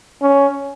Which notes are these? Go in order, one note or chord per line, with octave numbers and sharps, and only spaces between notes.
C#4